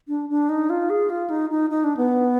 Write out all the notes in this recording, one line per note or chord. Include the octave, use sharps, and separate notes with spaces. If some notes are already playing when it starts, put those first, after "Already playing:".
D4
D4
D#4
F4
G#4
F4
D#4
D#4
D#4
D4
B3